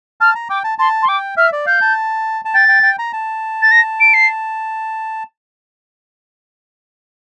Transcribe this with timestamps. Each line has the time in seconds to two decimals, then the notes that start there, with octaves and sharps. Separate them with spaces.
0.21 A5 F6
0.35 A#5
0.50 G5 D6
0.64 A5
0.78 A5 C6
1.02 C6
1.08 G5 D6
1.37 E5 F6
1.53 D5
1.66 F5 G6
1.81 A5
2.45 A5
2.54 G5 A6
2.68 G5
2.83 G5
2.99 A#5
3.13 A5
3.62 A6
3.71 A#6
4.00 D7
4.14 C7